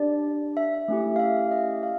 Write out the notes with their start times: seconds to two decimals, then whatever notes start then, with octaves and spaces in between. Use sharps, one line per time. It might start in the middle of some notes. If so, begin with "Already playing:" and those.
Already playing: D4 G4 D5
0.57 E5
0.88 A3 C#4 E4 G4
1.16 F5
1.20 E5
1.51 D#5
1.83 F5